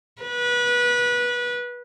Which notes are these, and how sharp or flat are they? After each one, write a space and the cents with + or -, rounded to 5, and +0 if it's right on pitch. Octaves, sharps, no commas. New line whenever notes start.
B4 -25